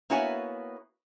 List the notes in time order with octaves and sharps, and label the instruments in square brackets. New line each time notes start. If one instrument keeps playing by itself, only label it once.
[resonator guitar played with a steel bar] A#3 B3 E4 F#4 C#5 G#5